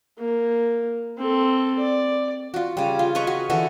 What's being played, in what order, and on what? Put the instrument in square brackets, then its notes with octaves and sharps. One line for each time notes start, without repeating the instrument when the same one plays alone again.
[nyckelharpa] A#3
C4 A4
D5
[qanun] F4 F#4
C#3 G3
F4
B4 D#5 A#5 C#6
F#4
D3 E3 D4 F#4